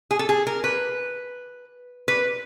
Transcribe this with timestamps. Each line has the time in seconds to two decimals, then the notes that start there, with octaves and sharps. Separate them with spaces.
0.11 G#4
0.19 A4
0.29 G#4
0.47 A#4
0.64 B4
2.08 B4